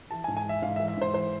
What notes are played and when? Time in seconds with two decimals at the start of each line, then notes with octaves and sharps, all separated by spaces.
0.11 E3 A5
0.24 G#5
0.28 G#2
0.37 G#5
0.45 E3 E5
0.62 G#2 F5
0.76 E5
0.80 E3
0.88 E5
0.97 G#2 C5
1.14 E3 C5